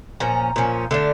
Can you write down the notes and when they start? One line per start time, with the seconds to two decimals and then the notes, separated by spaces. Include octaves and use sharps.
0.20 A#2 F3 C#4 A#5
0.56 A#2 F3 C#4
0.91 D3 A3 D4